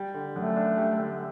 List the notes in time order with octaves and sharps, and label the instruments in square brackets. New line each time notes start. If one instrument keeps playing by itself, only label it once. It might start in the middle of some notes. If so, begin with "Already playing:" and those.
Already playing: [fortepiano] G3
D3
[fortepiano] F#2 [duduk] A3
[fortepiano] D4
G3
D3